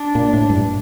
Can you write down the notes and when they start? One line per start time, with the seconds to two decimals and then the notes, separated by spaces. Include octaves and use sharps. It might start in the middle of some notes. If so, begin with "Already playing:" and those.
Already playing: D4
0.15 A#2
0.33 A2
0.50 G2